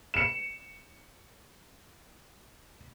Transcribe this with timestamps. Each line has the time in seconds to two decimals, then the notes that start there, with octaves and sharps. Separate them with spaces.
0.14 C#7 E7